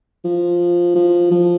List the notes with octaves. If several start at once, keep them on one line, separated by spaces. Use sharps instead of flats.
F3
F3
F3